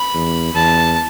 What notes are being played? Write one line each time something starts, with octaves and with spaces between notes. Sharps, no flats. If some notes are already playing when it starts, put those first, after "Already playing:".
Already playing: B5
E2
E2 A5